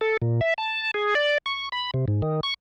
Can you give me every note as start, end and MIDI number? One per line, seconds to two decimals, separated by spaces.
0.01 0.17 69
0.22 0.41 46
0.41 0.54 76
0.58 0.91 81
0.94 1.14 68
1.15 1.38 74
1.46 1.69 85
1.72 1.91 83
1.94 2.05 48
2.08 2.22 44
2.22 2.40 51
2.43 2.54 85